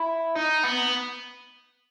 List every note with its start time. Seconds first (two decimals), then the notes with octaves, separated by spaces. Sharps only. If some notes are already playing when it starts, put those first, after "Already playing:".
Already playing: E4
0.35 D#4
0.64 B3